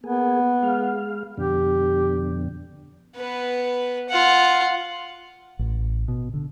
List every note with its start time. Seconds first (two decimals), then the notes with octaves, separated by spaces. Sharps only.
0.04 A#3 B3 G#4
0.63 G#3 F5
1.37 F2 B2 D3 G4
3.16 B3 B4
4.09 F4 F#5
5.59 A1
6.08 B2
6.34 D3